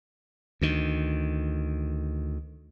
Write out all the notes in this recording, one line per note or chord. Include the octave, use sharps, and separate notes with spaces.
D2 D#3